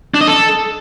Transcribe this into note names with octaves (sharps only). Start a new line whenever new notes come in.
D4
D#5
A4